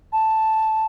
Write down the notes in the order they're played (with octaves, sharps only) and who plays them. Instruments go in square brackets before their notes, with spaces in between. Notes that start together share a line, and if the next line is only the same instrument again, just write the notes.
[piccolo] A5